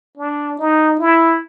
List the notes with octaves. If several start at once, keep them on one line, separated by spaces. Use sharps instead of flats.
D4
D#4
E4